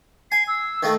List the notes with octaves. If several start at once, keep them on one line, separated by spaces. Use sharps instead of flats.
G#5 C7
E6
D#3 A3